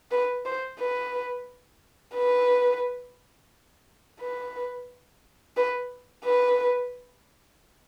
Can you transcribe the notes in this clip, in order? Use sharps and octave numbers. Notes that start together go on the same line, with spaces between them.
B4
C5
B4
B4
B4
B4
B4